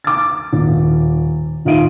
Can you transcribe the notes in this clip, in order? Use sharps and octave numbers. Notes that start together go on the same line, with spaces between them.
D6 A6
D#1
D#1 D#4 F4 E5 D7 D#7